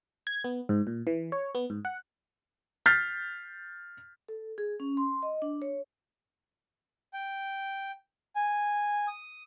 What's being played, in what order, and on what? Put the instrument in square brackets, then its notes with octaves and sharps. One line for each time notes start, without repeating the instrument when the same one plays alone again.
[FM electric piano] G#6
B3
G#2
A#2
E3
C#5
B3
G#2
F#5
[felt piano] F6 G6 A6 B6 C7
[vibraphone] A4
G#4
C#4
C6
D#5
D4
C#5
[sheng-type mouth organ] G5
G#5
D#6